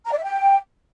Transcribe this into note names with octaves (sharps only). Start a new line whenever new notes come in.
A#5
D5
E5
G5